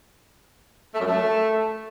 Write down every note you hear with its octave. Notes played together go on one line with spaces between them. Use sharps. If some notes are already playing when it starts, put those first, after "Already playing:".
A3
F#2
A3